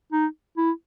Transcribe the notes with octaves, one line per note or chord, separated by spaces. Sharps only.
D#4
E4